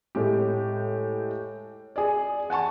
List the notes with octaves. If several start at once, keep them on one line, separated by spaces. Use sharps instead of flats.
A2 G#3 G4
G#4 D5
F#5 G#5 A5 C#6